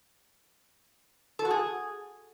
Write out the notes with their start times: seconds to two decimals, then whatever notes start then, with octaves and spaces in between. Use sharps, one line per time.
1.39 A4
1.45 F#4
1.51 G#4